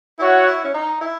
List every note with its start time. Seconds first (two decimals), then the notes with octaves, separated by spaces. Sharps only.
0.19 E4 F#4 C#5 F#5
0.46 E4
0.64 C#4
0.74 D#4
1.01 E4